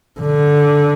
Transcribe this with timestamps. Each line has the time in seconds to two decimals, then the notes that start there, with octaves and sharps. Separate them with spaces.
0.20 D3